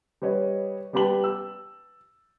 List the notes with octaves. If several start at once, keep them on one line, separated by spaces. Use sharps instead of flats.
G3 B4 C#5 D#5
G3 B3 G4 A5 B5 F#7
E6